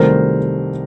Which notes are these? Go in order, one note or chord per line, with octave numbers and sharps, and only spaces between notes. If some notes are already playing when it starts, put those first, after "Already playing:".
Already playing: C2 C3 D#3 F#3 A3 A#4 C5